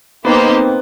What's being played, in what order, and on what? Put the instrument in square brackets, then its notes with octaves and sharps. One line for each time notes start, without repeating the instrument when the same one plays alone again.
[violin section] A#3 D#4 G4 C5 [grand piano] B3
[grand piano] C4